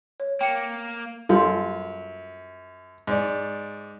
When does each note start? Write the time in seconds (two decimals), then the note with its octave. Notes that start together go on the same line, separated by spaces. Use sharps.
0.20 C#5
0.41 A#3 G5 C#7
1.29 F#2 G3 F4 A4
3.07 G#2 D5